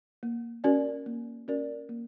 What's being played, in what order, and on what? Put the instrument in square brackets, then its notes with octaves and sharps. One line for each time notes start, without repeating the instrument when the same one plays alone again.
[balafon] A#3
C#4 F#4 A#4 D5
A#3
C#4 F#4 A#4 D5
A#3